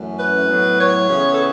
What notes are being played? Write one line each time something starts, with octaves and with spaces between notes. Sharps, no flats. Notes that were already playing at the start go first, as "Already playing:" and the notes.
Already playing: F#2 E3 A3 C#4
B4
A2 F#3 B3
C#5
C#3 E3 B3
A4